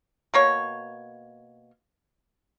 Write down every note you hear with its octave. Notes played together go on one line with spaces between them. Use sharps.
B2 A#3 C#5